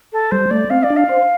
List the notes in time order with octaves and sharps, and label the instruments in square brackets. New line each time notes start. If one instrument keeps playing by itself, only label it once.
[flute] A4
[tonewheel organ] G3 [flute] C5
[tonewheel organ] A3 [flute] D5
[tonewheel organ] C4 [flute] F5
[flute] D5
[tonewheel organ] D4
[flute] F5
[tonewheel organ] C5